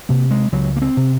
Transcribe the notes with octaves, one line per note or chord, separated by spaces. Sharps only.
C3 A#3
G#3
C#2 F#3
A#3
C4
C3